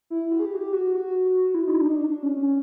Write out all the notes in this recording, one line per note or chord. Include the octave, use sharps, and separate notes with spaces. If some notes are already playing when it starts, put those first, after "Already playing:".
E4
F#4
G#4
G4
F#4
G4
F#4
E4
D#4
D4
D#4
D4
D4
C#4
C#4